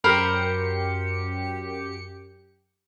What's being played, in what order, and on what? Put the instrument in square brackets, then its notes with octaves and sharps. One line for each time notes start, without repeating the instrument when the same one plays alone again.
[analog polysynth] F#2 G4 C#7 [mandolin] A#4 C5 B5